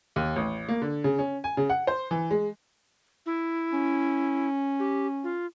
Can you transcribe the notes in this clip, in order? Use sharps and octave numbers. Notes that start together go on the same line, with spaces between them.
D#2
A1
A#3
D3
C#3
C#4
G#5
C#3
F#5
C5
E3
G#3
E4
C#4
G4
F4